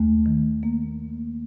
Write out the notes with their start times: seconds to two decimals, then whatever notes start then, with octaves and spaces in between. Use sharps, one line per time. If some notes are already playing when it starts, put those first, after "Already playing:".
Already playing: D#2 A3
0.26 D#3
0.63 A#3